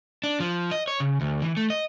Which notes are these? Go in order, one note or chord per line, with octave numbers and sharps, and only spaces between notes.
D4
F3
D#5
C#5
C#3
D2
E3
A3
D#5